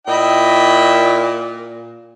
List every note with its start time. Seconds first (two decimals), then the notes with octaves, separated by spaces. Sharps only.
0.08 A#2 E4 D#5 G5